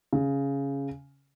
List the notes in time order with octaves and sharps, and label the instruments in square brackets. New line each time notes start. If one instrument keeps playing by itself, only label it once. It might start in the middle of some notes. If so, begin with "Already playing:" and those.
[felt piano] C#3